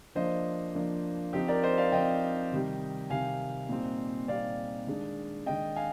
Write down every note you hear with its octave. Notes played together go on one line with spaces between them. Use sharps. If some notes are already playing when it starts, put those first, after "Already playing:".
F3 A#3 D4 C5 D#5
F3 A#3 D4
F3 C4 D#4 G4
A#4 D5
C5 D#5
D5 F5
F3 C4 D#4 D#5 G5
C3 D#3 G3
C3 D#3 G3 F5 G#5
A#2 G3 C4 D#4
A#2 G3 C4 D#4 D5 F5
D#3 G#3 D4
D#3 G#3 D4 D#5 G5
F5 G#5